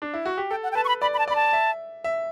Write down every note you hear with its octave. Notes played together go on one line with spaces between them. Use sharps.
D4
E4
F#4
G4
A4 G5
F#5
G5
B4 A5
C#6
B5
D5 B5
B5
A5
D5 B5
A5
E5
E5